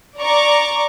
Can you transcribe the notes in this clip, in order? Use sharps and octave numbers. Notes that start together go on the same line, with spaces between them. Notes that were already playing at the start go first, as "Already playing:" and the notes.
D5 A#5 C#6 D6